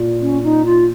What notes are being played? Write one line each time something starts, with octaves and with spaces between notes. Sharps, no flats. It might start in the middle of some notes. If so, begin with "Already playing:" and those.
Already playing: A#2
C#4
D#4
F4